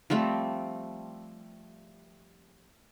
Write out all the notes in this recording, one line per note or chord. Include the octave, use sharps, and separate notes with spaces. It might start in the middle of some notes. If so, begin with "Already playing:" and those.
F3 G3 A3 C4